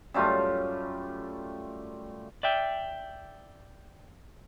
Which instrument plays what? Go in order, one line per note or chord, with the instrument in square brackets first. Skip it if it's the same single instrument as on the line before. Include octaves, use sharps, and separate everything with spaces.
[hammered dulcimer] F#2 G3 A3 F4
[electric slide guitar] D5 E5 G5